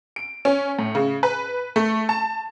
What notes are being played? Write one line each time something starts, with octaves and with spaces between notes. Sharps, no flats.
D7
C#4
A2
C#3
B4
A3
A5